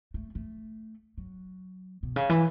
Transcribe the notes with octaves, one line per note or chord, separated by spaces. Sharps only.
A3
A3
F#3
B2
C#3
E3